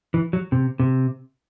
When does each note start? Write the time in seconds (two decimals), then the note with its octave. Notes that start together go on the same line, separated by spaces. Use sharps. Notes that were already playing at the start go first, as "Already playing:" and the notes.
0.14 E3
0.33 F#3
0.52 C3
0.79 C3